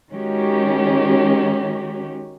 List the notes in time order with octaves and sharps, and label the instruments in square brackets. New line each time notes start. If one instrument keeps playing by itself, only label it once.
[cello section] D#3 G#3 C#4 F#4 G4